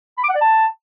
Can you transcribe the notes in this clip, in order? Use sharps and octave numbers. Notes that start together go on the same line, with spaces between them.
B5
D6
F#5
D5
A5